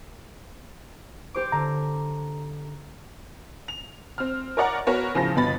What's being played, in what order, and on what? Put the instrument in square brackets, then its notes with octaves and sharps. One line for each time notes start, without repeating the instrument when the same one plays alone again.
[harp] G4 C5 D6
[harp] D3 [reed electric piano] A#5
[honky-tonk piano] F7
C4 F6
A#4 C#5 D5 F#5 A#5
B3 F#4 A#4 C#5
A1 C#3 F3 C5 A#6
G1 B2 B3 B5 A6